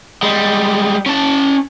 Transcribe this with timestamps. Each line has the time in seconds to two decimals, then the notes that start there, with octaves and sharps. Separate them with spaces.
0.23 G3 G#3
1.06 C#4 A5